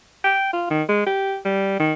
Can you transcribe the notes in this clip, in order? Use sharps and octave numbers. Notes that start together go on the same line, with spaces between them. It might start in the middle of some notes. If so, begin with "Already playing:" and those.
G5
F4
D#3
G#3
G4
G3
D#3